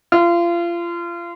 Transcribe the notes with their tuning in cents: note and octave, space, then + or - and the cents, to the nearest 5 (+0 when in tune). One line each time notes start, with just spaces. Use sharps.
F4 -30